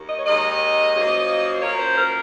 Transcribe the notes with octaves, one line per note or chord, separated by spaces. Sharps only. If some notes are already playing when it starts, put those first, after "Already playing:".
Already playing: D#2
D#5
C#5
D#2 D#3 G#3 D#5
F#2 F3 A#3
F#2 F3 A#3 C#5
C5
A#4